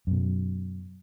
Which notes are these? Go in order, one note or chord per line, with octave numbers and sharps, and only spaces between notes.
F#2 B2